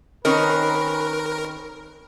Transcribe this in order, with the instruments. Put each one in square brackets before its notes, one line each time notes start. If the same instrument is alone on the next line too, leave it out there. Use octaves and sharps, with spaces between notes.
[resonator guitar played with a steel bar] D#3 C4 C#4 [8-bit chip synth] A#4 [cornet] B4